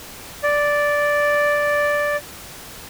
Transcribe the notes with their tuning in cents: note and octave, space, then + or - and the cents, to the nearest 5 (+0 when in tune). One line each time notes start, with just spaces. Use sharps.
D5 -5